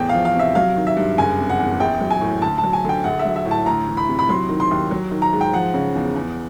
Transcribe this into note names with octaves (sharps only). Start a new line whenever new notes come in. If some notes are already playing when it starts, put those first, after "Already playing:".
Already playing: E2 A2 G5
F3 F5
F5
C3
E5
F#3 F5
D#3
E5
G2
F#1 G#5
C3
F#5
E2
A#1 G5
F#3
G#5
A2
D2 A5
A5
F#3
G#5
D3 G5
A#1 F#5
E5
F#3
E5
A2
A5
D2 A#5
E3
B5
C3
B5
F#3 C6
D#3
C6
D#2
F#3
D#3
A#5
G#2
G5
F3 F#5
C#3
E2
E2